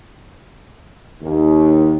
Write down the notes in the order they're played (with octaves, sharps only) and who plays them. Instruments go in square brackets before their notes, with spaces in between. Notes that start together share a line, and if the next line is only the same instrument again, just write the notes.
[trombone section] D#2